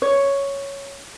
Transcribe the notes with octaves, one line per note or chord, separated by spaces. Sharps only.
C#5